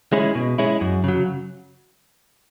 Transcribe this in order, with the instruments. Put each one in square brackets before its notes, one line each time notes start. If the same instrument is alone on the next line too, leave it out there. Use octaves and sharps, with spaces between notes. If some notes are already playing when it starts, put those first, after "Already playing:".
[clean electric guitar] G#3 C#4 E4
B2
G#3 C#4 E4
F#2
C#3 F#3